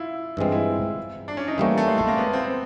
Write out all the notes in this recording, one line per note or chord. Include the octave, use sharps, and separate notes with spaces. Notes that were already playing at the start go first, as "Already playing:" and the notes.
Already playing: E4 F4
G2 E3 G#3 C4 F4
E4
D4
C#4
D#4
E3 G3 A3 A#3 C#4
A3
G#3
A3
A#3
B3
C4